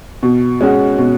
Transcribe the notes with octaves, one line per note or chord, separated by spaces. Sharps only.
B2
G#3 C#4 F#4
B2